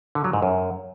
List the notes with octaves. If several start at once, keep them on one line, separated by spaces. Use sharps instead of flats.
D3
F#3
G#2
F#2